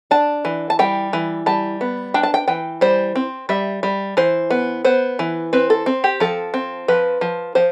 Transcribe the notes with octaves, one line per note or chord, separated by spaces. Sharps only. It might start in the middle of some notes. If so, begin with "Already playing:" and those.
D4 A5
E3
A5
G3 G5
E3
G3 A5
B3
D4 G5
A5
G5
E3 G5
G3 C5
C4
G3 E5
G3
E3 C5
B3
B3 C5
E3
C4 B4
A4
C4
G4
F3 A4
C4
F3 B4
F3
F3 C5